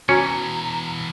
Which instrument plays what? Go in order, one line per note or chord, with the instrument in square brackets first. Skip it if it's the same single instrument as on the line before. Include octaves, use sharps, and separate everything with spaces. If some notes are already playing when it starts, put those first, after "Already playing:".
[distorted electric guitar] B2 E3 [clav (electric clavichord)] C#4 [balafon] F#4 [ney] A#5